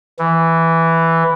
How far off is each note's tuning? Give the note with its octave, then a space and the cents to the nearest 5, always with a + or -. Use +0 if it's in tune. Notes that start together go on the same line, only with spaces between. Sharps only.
E3 +0